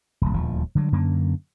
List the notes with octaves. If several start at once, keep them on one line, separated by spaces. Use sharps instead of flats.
D#1 C2
D#1 D2 F3
D3 F#3 G3
F#2 D3 A#3 C#4